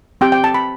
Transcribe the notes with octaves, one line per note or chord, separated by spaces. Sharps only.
C4 G4 G5
G5
A5
B5